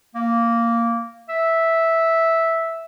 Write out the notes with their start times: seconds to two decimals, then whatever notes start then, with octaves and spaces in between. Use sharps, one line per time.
0.15 A#3
1.29 E5